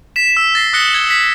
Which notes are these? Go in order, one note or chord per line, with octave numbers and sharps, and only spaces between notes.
B6 E7
E6
A6 A#6 C7
D#6 F#6 A#6 C#7 G7
G#6
B6